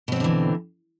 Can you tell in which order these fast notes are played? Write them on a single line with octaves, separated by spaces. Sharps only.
B2 C4 F#3 D3 E3